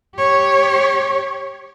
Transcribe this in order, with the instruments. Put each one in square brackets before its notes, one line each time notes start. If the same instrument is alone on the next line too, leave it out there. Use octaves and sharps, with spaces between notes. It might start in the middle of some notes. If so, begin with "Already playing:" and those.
[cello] G4 C#5